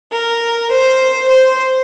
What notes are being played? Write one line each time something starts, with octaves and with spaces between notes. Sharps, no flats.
A#4
C5
C5